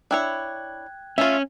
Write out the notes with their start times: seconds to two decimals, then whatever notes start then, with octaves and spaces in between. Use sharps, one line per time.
0.11 D4 E4 C#5 G5 F#6 G#6
1.18 A3 C#4 F4 E5